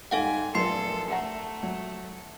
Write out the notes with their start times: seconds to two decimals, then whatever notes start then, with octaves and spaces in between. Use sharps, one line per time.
0.11 G#2 G3 G4 A4 F5 F#5 G#5
0.55 F1 A#1 F#2 A4 C6 C7
1.10 A3 E5 F#5 A#5
1.63 F#3